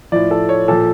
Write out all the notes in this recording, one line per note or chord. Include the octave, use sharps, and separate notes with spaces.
A2 F3 D5
A4
C#5
A#2 F3 A4